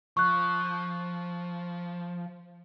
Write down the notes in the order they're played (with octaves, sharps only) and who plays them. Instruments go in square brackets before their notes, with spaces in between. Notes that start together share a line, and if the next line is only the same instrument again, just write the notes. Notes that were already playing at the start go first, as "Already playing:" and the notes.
[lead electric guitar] F3 [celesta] C#6 F#6